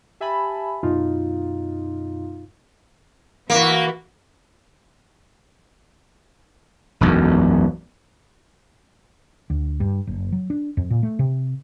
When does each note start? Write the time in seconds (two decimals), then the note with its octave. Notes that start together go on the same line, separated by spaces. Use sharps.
0.20 G4 E5 G#5 A5 B5
0.83 F#2 B2 D#4 F4
3.50 E3 A#3 E4 F#4
7.01 E1 B1 F#2
9.50 D2
9.80 G2
10.07 F#1
10.32 F#3
10.50 D4
10.77 F2
10.90 A#2
11.03 A3
11.19 C3